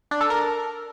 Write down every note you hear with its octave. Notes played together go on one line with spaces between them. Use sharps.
D4
A4
A#4